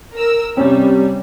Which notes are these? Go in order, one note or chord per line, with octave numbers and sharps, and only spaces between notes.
A#4 E6
C3 G3 C4 C#4 C#5